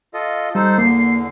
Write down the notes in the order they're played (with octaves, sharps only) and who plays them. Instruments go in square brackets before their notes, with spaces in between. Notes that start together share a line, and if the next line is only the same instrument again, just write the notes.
[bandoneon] F4 A4 D#5
[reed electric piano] G3 [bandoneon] D#4 A4 C5 [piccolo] E6
[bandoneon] E2 D3 [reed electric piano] A#3 [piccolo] C7